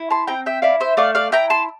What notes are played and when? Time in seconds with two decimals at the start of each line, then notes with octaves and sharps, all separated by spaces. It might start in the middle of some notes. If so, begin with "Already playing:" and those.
Already playing: E4
0.11 A5 C6
0.27 C4 G5 A#5
0.46 E5 G5
0.62 E4 D5 F5
0.81 C5 E5
0.97 A3 D5 F5
1.15 D5 F5
1.32 E4 G5 A#5
1.50 A5 C6